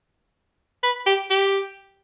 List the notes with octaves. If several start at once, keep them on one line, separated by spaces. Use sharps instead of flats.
B4
G4
G4